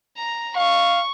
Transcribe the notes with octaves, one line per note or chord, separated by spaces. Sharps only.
A#5
F5 C#6